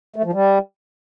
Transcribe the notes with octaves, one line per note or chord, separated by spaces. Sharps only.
A3
F3
G3